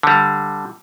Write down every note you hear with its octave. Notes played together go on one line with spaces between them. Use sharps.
D3 G3